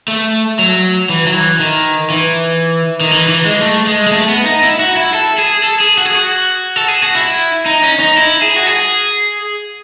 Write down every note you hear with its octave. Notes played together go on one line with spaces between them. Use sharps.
A3
F#3
E3
F#3
E3
D#3
E3
D#3
E3
E3
G#3
A3
G#3
G#3
A3
B3
D#4
E4
F#4
E4
A4
G#4
A4
G#4
F#4
G#4
F#4
A4
G#4
F#4
E4
D#4
C#4
D#4
E4
G#4
F#4
G#4